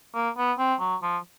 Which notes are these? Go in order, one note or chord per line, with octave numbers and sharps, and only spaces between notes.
A#3
B3
C4
F#3
F3